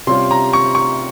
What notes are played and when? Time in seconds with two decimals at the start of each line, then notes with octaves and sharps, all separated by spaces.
0.07 C3 G3 C#4 F4 C6
0.31 A#5
0.53 C#6
0.75 C#6